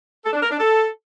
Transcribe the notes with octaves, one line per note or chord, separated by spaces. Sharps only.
A4
D4
A#4
D4
A4